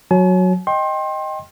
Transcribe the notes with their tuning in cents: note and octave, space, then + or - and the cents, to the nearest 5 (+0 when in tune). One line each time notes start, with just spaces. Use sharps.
F#3 -10 G#5 +45
D#5 +0 G5 +0 C6 +30